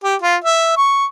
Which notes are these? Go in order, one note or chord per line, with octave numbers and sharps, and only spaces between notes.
G4
F4
E5
C#6